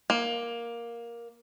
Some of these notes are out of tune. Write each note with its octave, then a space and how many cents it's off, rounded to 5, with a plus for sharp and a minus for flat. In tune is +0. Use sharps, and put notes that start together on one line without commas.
A#3 +10